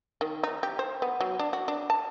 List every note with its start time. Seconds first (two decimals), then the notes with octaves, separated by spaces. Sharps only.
0.21 D#3
0.43 D#4
0.63 G4
0.79 C5
1.02 B3
1.21 F#3
1.39 D4
1.53 F#4
1.68 D4
1.90 A5